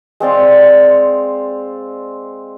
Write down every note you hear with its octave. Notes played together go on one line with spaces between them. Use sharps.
G#3 C4 D5 F5